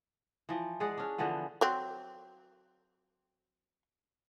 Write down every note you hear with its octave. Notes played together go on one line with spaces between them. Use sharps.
E3 F3
G#3 G#4 D5 F#5
C#4 D4
D3 E3 F3 B3
F#3 C4